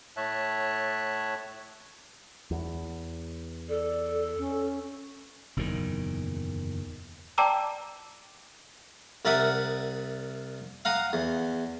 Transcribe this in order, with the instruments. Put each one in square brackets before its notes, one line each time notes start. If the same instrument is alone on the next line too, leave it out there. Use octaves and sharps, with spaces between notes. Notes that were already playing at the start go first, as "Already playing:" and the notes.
[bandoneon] A2 C#5 E5 A5 F#6
[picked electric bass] E2
[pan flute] A4 [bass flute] D5
[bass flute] C#4
[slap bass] F#1 E2 A#2 D#3
[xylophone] D5 G5 A5 A#5 D6 E6
[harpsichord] C2 A#4 D5 E5 F#5 D#6
F5 F#5 A#5 D#6
E2